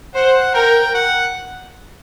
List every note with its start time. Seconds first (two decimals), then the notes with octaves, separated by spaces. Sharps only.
0.14 C5 F#5
0.54 A#4 G5
0.95 F#5